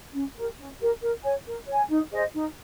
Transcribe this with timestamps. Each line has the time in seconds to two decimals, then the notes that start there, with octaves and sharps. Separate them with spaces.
0.14 C#4
0.36 G4 A#4
0.58 C#4
0.80 G4 A#4
1.02 A#4
1.23 C#5 G#5
1.46 A#4
1.67 C#5 G#5
1.89 D#4
2.11 G#4 C5 D#5
2.34 D#4